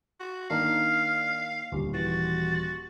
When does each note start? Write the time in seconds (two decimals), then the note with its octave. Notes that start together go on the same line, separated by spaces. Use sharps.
0.20 F#4
0.50 D#3 A#3 D4 D#4 F5 F6
1.72 D#1 D2
1.94 E3 F#4 A6